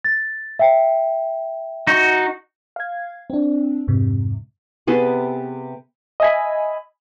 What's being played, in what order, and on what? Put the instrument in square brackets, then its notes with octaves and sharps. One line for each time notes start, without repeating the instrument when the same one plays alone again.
[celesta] A6
E5 G5
[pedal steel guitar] D#4 F#4
[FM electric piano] F5 G#6
C4 D4
F2 G#2 C3
[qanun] C3 B3 G#4 A4
[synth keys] D#5 E5 G#5 B5